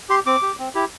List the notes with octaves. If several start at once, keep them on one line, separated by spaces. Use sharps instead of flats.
G4 C6
C4 D6
G4
C4
E4 G4